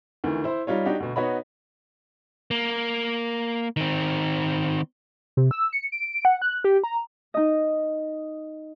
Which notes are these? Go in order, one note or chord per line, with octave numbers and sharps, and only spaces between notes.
D2 D#3 E3
E4 C5
G3 D#4 F4 C#5
D4 D#4 F#4 G4
D2 B2
B3 D#4 F#4 C#5 D#5 B5
A#3
D#3 C4
C3
E6
C#7
D7
F#5
F#6
G4
A#5
D#4 D#5